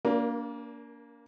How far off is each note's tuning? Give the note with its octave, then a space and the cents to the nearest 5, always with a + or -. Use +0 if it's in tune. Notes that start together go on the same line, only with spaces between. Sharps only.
A#3 +0 D4 -35 A#4 +35